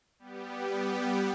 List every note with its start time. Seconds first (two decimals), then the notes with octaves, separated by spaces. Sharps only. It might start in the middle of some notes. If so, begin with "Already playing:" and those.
0.19 G3 B3 G4